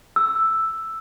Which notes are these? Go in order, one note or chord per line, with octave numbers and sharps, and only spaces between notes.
E6